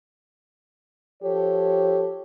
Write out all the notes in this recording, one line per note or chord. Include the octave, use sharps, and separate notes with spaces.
F3 G4 A4 C#5